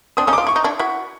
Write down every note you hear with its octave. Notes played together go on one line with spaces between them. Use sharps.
C4 D4 D#6
C#4 D#4 D#6
F4 D6
E4 C#6
D#4
D4 E4
E4 F#4